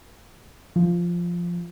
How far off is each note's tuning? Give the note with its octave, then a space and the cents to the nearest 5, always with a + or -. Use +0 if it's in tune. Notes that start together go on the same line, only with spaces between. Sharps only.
F3 -5